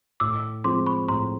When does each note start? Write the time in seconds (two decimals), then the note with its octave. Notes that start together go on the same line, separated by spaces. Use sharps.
0.20 A2 D6 E6
0.64 F3 G#3 C4 C6 D6
0.86 B5 C#6
1.08 A2 A#5 C6